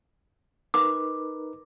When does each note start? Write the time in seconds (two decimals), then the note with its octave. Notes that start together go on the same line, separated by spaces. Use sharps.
0.74 D#4 A#4 B4 D6